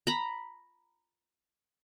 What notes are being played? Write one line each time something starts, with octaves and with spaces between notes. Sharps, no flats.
A#5 B5